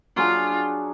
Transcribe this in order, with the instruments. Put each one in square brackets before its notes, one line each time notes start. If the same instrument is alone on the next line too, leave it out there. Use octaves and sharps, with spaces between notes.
[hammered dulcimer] F#3 D4 G#4 [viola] F4